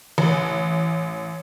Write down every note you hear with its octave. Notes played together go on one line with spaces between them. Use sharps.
A1